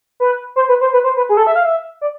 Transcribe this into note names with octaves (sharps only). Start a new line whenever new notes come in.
B4
C5
B4
C5
B4
C5
B4
G#4
A4
E5
F5
E5
D5